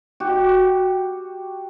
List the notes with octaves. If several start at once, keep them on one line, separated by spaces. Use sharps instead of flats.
F#4 G4